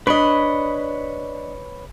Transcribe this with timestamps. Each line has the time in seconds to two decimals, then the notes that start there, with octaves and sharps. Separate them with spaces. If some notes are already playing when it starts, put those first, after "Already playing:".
0.07 D4 B4 C#5 D#5 B5